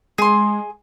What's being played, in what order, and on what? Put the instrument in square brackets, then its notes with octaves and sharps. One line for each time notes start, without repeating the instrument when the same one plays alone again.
[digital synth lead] G#3 [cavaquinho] G#4 C6